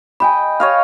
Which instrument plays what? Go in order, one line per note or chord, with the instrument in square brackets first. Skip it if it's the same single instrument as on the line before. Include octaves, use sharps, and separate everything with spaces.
[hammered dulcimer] D#5 G5 [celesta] G#5 B5
[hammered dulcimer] C#5 D#5 F5